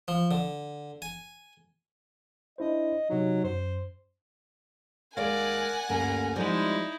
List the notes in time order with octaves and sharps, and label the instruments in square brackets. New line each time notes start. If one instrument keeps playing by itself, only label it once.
[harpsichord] F3
D3
G#5
[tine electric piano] D4 E4 C5 [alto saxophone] D#5
[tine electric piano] C3 D#4 [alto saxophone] F#3
[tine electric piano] F#2 [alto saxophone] C5
[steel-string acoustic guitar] D#2 G#3 F5 [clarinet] A#4 [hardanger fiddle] D5 [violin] F#5 G#5
[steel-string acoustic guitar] D2 G2 A#3 [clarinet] C#4 [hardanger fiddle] A#5
[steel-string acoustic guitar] F3 G3 C4 [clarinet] G#3 [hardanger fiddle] D#4 E4